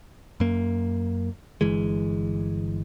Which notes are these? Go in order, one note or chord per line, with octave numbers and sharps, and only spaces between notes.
F#2 A#3
G1 E3 G#3